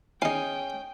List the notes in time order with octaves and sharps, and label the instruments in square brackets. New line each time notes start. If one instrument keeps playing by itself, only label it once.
[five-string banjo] C#4 [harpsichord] D#4 F5 [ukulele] G#4 G#5 [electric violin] G5